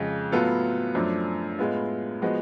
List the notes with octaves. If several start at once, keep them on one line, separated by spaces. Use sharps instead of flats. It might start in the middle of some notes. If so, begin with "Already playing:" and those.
Already playing: F2 C#3 G#3
A2 F#3 B3 F4 A4
F#2 F3 A3 D4
A2 G#3 B3 F4
F3 G#3 B3 F#4